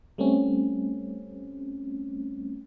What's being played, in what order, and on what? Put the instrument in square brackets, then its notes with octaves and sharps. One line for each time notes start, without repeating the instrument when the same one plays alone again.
[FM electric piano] G3 A3 C4 C#4